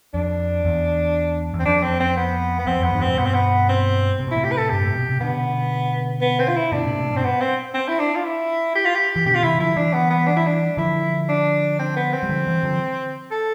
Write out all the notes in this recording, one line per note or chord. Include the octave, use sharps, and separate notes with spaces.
F2 D4
E2
E2
C4
F2 D4
C4
C4
B3
B3
F2 C4
F2 B3
E2 G2
F2 A2 C4
C3
G2 B2 B3
C4
B3
C4
C3
B2
A2 C3 E4
G4
B4
A4
G2 G4
A2
B2
C3
B2 D3 B3
B3
C4
F4
E4
B2 D3 D4
A2 C3
A2 C3
G2 B2
C4
B3
C4
C4
E4
D4
F4
E4
G4
F4
G4
E3
B2 D3 G4
F4
C3 E3 E4
D3 F3 E4
E3 G3 D4
B3
B3
D4
E4
D4
D3 F3 E4
D4
C4
B3
C4
G3
D3 F3
E3 G3
D3 F3
A4